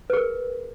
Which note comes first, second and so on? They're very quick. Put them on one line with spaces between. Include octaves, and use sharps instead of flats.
B4 G#4 A#4